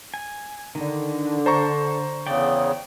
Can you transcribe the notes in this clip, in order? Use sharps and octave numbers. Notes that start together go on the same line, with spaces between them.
G#5
D3 D#3
A4 C5 A#5 C#6
E2 C#3 D5 G5